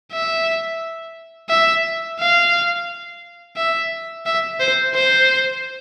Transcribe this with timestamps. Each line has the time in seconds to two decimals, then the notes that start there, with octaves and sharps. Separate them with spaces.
0.12 E5
1.49 E5
2.19 F5
3.57 E5
4.26 E5
4.60 C5
4.95 C5